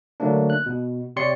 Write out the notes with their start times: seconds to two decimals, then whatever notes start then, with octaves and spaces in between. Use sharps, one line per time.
0.20 D3 F#3 A3 A#3 D4
0.50 F#6
0.66 B2
1.16 C3 G4 C#5 D5 C6 C#7